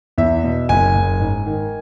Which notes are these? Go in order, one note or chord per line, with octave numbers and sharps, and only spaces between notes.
E2 E5
B2
F#1 G#5
F#1
G#2
D#3